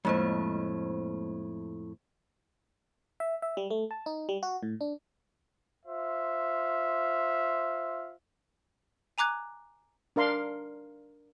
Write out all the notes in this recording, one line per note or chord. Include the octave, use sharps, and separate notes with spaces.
F2 A2 G#3 A#3 C5
E5
E5
G3
A3
A5
D#4
G3
F#4
A2
D4
F4 C5 E5
G#5 A#5 D6 F#6 G#6
D4 A#4 F5 C6